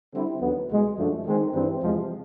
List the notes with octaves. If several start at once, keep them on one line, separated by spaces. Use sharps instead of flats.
D3 G3 C4 E4
D#2 D3 F#3 B3
C2 B2 G#3
F#2 D3 F3 A3
D#3 G#3 C4 D#4
G2 E3 G3 C4
E2 C3 F3 G#3